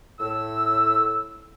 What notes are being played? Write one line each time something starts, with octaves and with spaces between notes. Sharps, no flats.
A2 E6